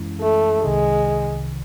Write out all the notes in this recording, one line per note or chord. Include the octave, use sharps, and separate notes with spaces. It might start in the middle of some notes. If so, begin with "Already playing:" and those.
Already playing: F#2 E3 G#3 C#4 E4
A3
C2 C3 D#3 G#3